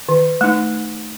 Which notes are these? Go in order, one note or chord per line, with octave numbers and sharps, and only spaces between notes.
D#3
A3 D#4